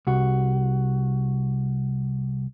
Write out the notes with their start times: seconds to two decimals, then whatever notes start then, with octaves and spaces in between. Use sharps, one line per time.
0.07 C2 F#4